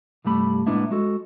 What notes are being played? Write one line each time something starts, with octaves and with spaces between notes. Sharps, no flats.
C2 G2 G3 A3 B5
A2 G#3 A#3 B3 D4 E4
G#3 F#4 A4